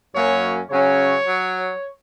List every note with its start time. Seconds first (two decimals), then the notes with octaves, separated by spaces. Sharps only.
0.15 F#2 F#3 A#3 C#4 C#5
0.70 C#3 F#3 C#4 C#5
1.26 F#3